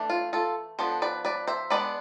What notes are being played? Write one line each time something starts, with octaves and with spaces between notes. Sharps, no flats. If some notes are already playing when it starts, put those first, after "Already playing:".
Already playing: E3 A3 D4
F4
F4 A4
F3 B3 D4 A4 C5
B4 D5
B4 D5
C5 E5
G#3 B3 D4 B4 D5